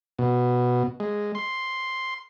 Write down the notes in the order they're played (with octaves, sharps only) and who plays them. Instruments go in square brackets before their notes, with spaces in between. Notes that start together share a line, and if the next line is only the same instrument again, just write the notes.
[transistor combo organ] B2
G#3
C6